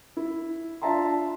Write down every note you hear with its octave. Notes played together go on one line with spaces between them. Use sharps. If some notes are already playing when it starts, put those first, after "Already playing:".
E4
D4 F4 E5 A5 A#5 C6